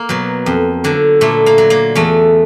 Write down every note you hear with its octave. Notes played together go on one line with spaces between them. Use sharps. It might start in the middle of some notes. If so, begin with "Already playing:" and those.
Already playing: A#3
B2 F#3
F2
D3 F#3
A#2 A3
A#3
F#3
A#3
E2 A3